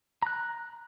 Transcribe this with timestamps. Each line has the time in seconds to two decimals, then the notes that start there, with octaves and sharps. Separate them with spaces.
0.22 A#5 F#6